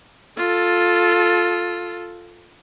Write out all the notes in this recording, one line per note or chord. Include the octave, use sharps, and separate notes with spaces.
F4 A4